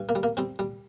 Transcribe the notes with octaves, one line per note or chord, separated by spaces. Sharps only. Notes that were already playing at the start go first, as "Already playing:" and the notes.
Already playing: G2
A#3
G3
A#3
G3 C4
G3